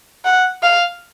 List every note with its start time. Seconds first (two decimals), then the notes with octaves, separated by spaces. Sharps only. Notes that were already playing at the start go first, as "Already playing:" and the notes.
0.25 F#5
0.62 F5